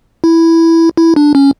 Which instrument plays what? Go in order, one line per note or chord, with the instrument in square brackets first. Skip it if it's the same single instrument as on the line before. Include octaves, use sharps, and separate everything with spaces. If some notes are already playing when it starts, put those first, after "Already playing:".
[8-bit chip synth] E4
E4
D4
C#4